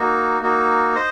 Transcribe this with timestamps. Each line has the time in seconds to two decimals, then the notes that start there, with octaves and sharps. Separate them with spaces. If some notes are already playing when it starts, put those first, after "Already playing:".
Already playing: A#3 D#4 F#4
0.41 A#3 D#4 F#4
0.95 C5 D#5